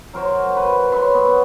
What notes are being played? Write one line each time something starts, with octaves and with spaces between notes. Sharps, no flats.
F#3 A#4 C5 C#5
B4
B4 C#5 E5 C6
B3